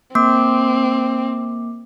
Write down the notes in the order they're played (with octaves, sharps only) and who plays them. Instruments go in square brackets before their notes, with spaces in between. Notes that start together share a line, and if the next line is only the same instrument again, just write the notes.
[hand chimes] A#3 D6 [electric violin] C4